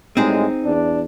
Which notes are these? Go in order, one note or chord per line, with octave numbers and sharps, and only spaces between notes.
A2 G3 G#3 C4 D#4 G#4
E2 D4